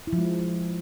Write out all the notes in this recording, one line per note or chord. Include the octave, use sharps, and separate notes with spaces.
E4
F3
G#3